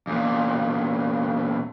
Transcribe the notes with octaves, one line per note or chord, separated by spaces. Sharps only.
E2 A#2